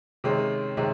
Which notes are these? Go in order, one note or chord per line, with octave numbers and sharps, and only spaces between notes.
C3 D#3 G#3 C#4
C3 D#3 G#3 C#4